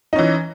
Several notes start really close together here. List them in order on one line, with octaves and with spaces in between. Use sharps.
D#4 C#4 E3